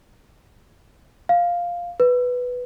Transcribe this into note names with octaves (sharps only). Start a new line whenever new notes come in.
F5
B4